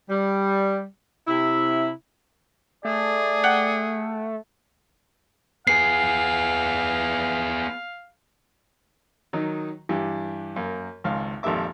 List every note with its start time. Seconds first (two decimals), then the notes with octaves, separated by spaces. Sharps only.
0.10 G3
1.27 C3 E4
2.85 A3 G#4 D5
3.44 F#5 G5
5.67 B3 G#4 F5 C7
9.33 D#3 F#3 D#4
9.89 G2 E3 G4
10.56 F#2 A#3
11.04 G#1 C#2 F5
11.43 G#1 F2 A#2 G4 E5 D6